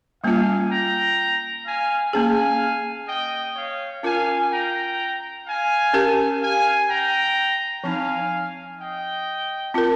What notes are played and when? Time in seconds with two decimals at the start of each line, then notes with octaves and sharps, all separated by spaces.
0.23 G3 A#3 C#4 F4 F5 G#5
0.70 G5 A#5
1.66 F5 G#5
2.13 A#3 C#4 G#4 F5 G#5
3.08 D#5 G5
3.55 C#5 F5
4.03 C#4 F4 A#4 F5 G#5
4.51 G5 A#5
5.46 F5 G#5
5.94 C#4 G4 A#4
6.41 F5 G#5
6.88 G5 A#5
7.83 F3 C4 D#4 F5 G#5
8.79 D#5 G5
9.74 C4 F4 A#4